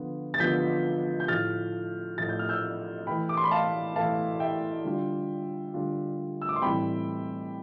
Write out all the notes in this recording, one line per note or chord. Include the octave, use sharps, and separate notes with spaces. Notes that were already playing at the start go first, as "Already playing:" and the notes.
Already playing: D3 F3 B3 F4
A6
D3 F3 B3 F4 G6 B6
G6
A2 F3 A3 F6 A6
A2 F3 A3 A6
G6
F6
E6 G6
E3 A3 E4 G5 B5
D6
C6
B5
F5 A5
E3 A3 E4 F5 A5
E5 G5
D3 G3 D4 F4
D3 G3 D4 F4
E6
D6
C6
A2 E3 G3 C4 G5 B5